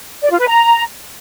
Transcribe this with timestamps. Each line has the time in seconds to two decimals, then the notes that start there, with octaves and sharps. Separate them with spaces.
0.23 D5
0.31 F4
0.39 B4
0.48 A#5